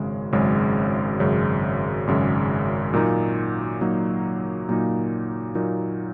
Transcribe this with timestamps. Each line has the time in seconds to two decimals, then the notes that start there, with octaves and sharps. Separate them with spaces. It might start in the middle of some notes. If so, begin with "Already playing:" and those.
Already playing: G#1 F#2 C#3 G#3
0.33 G#1 F#2 C#3 G#3
1.20 G#1 F#2 C#3 G#3
2.07 G#1 F#2 C#3 G#3
2.94 A#2 F#3 A#3 D#4
3.81 A#2 F#3 A#3 D#4
4.69 A#2 F#3 A#3 D#4
5.55 A#2 F#3 A#3 D#4